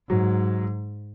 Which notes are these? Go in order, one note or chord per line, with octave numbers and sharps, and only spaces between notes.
G#2 F#3